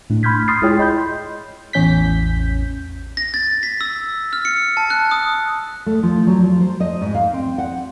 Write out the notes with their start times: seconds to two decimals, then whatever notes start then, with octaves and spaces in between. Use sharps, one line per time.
0.10 A2 A3 D4
0.23 B5 C6 F6 G6 G#6 B6
0.48 C6 D#6 F6 A6 C7
0.62 G#3 E4 F4 G#4 C#5 G5
0.79 D#5 B5 C6 G6
1.73 A1 E2 C#4 G6 B6
3.17 A#6
3.34 A6
3.63 B6
3.81 E6
4.33 F6
4.45 C#7
4.77 A5
4.90 F#6
5.11 D#6
5.86 A3
6.03 F3
6.27 F#3
6.43 F3
6.61 C5
6.80 D#5
7.02 G#2
7.15 F5
7.34 C4
7.58 F#5